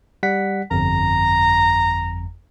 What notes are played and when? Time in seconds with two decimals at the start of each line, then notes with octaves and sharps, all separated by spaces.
0.23 G3 F#5 B6
0.71 G1 F2 A#5